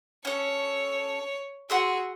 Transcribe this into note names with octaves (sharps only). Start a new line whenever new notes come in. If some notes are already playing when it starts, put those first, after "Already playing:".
C#4 A4 C#5
F#4 G#4 F#5 C6 E6